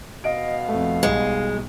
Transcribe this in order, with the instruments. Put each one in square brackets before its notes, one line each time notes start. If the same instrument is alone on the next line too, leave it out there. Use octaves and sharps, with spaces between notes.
[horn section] B2 F5 [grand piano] D#5 D7
[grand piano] F2 A3
[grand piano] B1 G3 [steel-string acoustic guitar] G#3